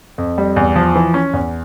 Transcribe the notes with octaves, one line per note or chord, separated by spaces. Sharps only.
F2
G3
E2
F3
E3
C#4
E2